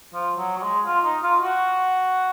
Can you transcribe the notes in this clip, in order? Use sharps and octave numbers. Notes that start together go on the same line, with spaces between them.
F3
F#3
F#3
G#3
F4
D#4
F4
F#4